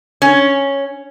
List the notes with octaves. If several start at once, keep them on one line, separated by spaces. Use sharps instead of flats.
C#4